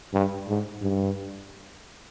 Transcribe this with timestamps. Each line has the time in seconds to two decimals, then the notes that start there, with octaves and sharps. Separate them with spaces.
0.14 G2
0.48 G#2
0.81 G2